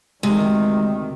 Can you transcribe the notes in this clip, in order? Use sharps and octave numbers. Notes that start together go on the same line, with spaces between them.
D2 C3 D#3 G#3